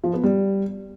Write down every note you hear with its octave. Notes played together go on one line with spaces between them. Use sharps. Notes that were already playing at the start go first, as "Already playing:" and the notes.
F3
B3
G3